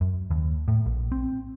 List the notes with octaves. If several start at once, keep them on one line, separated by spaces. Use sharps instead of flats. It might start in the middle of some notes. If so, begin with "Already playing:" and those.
F#2
D#2
A2
A#1
C4